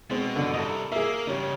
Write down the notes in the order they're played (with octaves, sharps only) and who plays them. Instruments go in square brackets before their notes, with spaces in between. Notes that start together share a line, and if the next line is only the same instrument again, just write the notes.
[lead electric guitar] B2 [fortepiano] G#3 C4
[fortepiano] F#2 D3
[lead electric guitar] C2 [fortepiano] A4 D#5
[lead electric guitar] A#3 [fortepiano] G#4 E5
[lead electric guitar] G2 C#3 [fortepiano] C#4 G4